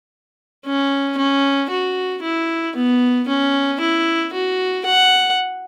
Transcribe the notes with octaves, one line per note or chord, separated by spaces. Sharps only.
C#4
C#4
F#4
E4
B3
C#4
E4
F#4
F#5